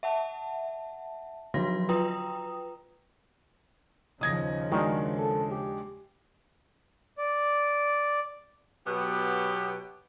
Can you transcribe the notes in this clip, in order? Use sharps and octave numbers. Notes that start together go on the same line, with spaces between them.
E5 F#5 A5
D3 F3 F#3 F#4 C6 A#6
F4 B4 G5 A#5 D#6
D#2 C#3 F3 D#4 D#6 G#6 A#6
D#3 G#3 D4 F#4
A4
G4
D5
B2 F#3 B3 G4